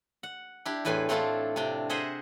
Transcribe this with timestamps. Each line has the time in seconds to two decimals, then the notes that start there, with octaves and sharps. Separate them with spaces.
0.23 F#5
0.66 D4 E4 G4
0.85 E2 A2 B4 G5 G#5 C6
1.09 A3 C4 D4 E4 F4 A5
1.56 C3 D4 G5
1.90 G#4 C5 D#5 E5 F#5